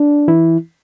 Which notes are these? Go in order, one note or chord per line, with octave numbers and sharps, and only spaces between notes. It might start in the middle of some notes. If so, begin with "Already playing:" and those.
Already playing: D4
E3 E4